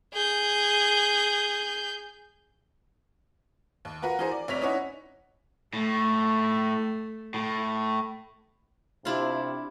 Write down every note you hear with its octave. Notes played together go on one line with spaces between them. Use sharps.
G#4 G6
D#2
F4 F#4 A#4 B4 F#5
E3 F#4 G#4 A#4 C5
D5
F1 C3 C#5 D5 B6 F7
C#4 D#4 E4 C#5 F#5
A2 A3
A2
C3 D4 E4 F4